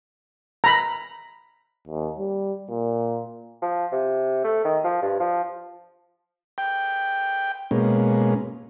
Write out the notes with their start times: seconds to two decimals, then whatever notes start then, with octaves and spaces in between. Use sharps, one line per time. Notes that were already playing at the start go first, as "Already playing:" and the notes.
0.64 A#5 B5
1.87 D#2
2.19 G3
2.69 A#2
3.62 F3
3.92 C3
4.44 A3
4.65 D#3
4.84 F3
5.02 G2
5.20 F3
6.58 G5
7.71 B2 G#3 A#3 C#4